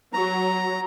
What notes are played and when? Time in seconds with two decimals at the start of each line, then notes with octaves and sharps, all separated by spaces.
0.13 F#3 A#5